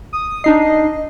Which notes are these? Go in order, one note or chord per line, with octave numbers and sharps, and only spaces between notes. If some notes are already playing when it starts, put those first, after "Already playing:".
D#6
D4 D#4 D#5 C7